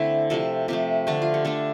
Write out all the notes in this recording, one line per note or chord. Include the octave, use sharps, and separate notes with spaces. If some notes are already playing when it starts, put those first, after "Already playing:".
Already playing: D3 A3 C4 E4
C3 F3 A3 A4
C3 F3 A3 G4
D3 A3 D4
F4
G4
D3 A3 D4 A4